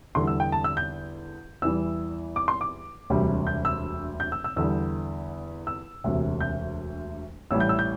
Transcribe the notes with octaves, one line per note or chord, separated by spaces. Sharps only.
E2 D3 G3 C6
E6
G5
A5
E6
G6
E2 E3 G3 E6
D6
C6
D6
E1 D2 C3 G3
G6
E6
G6
E6
E6
E2 D3 G3 E6
E6
E1 D2 C3
G6
A1 A2 G3 E6
G6
E6
G6